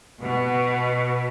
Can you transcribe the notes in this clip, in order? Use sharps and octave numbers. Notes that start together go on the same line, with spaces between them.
B2